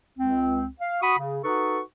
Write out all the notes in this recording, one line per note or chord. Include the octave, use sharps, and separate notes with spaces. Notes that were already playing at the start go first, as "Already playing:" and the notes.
C#2 C4
F5
F#4 B5 C#6 D#6
C#3
D#4 F#4 A4 B4 C#6